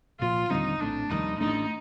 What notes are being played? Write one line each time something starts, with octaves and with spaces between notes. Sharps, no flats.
C2 A#2 F3 F4
D#2 D3 G3 C4 D#4
A#1 A2 A3 C4 D4
F1 D#2 D#3 G3 D#4
A1 A2 A3 D4 D#4